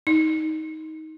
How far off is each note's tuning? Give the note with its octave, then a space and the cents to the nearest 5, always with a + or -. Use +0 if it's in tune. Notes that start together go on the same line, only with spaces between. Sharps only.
D#4 +20